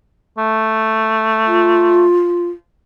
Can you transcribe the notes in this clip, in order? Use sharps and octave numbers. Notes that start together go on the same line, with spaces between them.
A3
F4